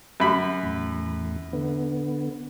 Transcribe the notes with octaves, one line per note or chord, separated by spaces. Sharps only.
F#2 B5
E2 A2
D3 B3